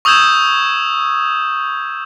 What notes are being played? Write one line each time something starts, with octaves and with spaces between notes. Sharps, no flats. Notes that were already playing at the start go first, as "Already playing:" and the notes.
C#6 D#6 E6 G6 G#6 E7